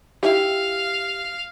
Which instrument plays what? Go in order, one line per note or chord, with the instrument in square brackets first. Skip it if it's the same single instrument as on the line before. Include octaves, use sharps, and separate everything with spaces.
[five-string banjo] E4 G4 [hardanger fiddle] F5